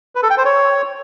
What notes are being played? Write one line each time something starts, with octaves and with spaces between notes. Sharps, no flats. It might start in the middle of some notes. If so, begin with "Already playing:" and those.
B4
A4
G5
C5
C#5